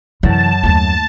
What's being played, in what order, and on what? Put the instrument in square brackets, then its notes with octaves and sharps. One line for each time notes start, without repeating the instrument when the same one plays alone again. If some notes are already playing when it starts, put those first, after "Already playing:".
[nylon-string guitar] F#2 [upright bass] C3 E3 [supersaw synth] A5
[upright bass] D#2 A3